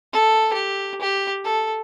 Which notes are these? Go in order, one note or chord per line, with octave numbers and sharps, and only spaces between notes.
A4
G4
G4
A4